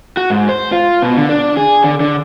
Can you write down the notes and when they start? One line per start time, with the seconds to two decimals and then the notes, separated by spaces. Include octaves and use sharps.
0.17 F#4
0.30 G#2
0.49 C5
0.72 F4
1.02 B2
1.18 D3
1.29 D4
1.57 G#4
1.84 D3
2.00 D3